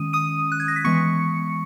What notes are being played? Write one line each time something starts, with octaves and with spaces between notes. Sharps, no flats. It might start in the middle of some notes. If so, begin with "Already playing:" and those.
Already playing: D#3 G#3 C#4 D#6 D#7
D#6 D#7
F#6
G#6
A#6
B6
E3 G#3 B3 C#6 C#7